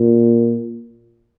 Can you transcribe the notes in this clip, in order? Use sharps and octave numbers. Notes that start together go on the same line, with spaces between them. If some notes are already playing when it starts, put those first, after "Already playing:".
Already playing: A#2